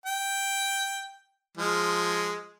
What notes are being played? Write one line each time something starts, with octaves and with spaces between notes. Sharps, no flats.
G5
F3 G#3